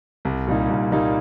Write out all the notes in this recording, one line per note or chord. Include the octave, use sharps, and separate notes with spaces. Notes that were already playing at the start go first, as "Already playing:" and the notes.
C2
A#2 G3 A#3 D#4
C2
A#2 G3 A#3 D#4